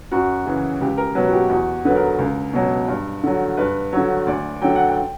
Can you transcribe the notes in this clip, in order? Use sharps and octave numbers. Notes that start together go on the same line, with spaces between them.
F#2 F#4
C#3 E3
C#2 G4
A#4
B2 F#3 B4
F#4
G4
E2 F#4
D3 F#3 B4
A#4
C#2
B2 F#3
G2
D3 F#3
G2 B4
D3 F#3 C#5
D2 D5
D3 F#3 G5
F#5
G5